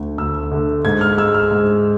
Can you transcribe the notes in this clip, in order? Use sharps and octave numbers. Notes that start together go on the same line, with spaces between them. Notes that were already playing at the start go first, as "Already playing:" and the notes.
Already playing: D2 D3 A3
D2 E6
D3 A3
G#2 G#6
F6
G#3 E6
F6
G#2